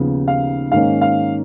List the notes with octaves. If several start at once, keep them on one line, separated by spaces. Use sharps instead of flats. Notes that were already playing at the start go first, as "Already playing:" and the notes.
Already playing: D#2 C#3 F3 B3
F5
G#2 D#3 A#3 C#4 F5
F5